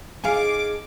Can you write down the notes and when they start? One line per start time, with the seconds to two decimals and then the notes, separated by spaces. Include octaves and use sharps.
0.24 D#4 G#4 A4 F5 G#5 D6